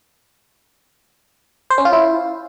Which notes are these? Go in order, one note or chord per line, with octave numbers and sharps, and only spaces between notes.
C5
C#4
F4
E4